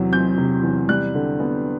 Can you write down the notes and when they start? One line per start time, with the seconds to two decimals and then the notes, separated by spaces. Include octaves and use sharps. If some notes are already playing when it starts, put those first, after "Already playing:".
Already playing: E2 C3 F#3
0.12 C4 G6
0.38 C3
0.63 E2
0.89 G3 F#6
1.14 D3
1.40 B3